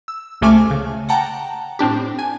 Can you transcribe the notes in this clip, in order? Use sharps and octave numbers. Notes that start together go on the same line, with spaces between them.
E6
C#2 C3 A3 G#5 D6 F6
C#3
F#5 G5 A5 A#5
A2 C4 D4 G4
G#5